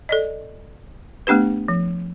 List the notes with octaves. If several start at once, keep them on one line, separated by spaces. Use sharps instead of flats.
A4 D5 D#5
A3 B3 D4 G4 B4
F3